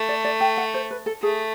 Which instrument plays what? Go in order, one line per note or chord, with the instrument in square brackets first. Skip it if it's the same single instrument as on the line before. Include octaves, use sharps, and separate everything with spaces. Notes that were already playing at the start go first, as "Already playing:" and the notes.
Already playing: [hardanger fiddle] A3
[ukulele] D5
D5
G5
F#5
C5
B4
A4
[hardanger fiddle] A3 [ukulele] G#4